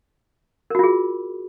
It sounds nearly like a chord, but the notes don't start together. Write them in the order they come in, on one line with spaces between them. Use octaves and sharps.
A#4 F#4 F4 G#4